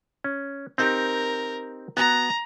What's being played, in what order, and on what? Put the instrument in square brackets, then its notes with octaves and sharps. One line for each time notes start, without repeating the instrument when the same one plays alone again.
[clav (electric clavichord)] C#4
[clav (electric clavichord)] C4 D#4 G4 [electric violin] A#4
[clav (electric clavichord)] B3 F#4 [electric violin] A#5